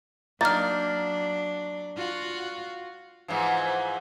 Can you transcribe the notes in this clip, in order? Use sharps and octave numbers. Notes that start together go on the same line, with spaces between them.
F#3 A#3 D4 D#4 F6 A6
F4 F#4
G#2 E3 F3